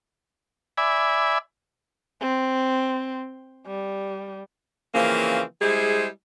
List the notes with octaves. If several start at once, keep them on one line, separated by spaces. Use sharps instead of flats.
D5 E5 G#5 B5
C4
G3
C#3 E3 F3 A#3 C4 C#4
G3 G#3 E4 G#4 C5